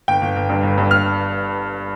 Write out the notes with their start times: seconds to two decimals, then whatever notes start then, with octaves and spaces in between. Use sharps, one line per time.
0.08 G1 G5
0.22 G1
0.36 G1
0.49 G2
0.63 G1
0.78 G2
0.91 F6